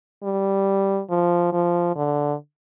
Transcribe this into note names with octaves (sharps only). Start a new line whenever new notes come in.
G3
F3
F3
D3